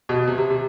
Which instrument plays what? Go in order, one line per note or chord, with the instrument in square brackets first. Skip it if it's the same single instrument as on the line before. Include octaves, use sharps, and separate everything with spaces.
[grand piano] B2
C3
C3
C3